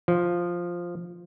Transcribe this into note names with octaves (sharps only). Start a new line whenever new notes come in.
F3